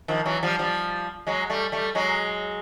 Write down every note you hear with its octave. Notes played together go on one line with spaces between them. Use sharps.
D#3 F3
E3 F#3
F3 G3
F3 G3
F#3 G#3
G3 A3
G3 A3
F#3 G#3